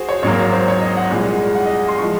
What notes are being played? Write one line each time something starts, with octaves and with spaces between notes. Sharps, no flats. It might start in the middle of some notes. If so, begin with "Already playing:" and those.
Already playing: F#4 G#4 C5
C#5
G#1 G#2 F#3 A#3 C#5
C#5
C5
C#5
D#5
F#5
C2 A#2 G#3 F#5
F#5
D#5
C6
F3 G#3 C#6